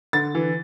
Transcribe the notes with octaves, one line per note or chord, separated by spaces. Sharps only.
D3 A6
E3